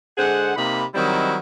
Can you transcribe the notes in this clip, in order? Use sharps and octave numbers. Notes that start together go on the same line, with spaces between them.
D3 G#3 G#4 C5 F#5
C3 A#3 D#4 B5
D#3 F#3 G3 C4 D#4 E4